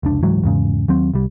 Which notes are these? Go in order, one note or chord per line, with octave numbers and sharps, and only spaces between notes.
F1 C#2 D4
C#2 G#2 E3 F#3
E2 G#2 C#3
D#2 F#3 C4
C2 G3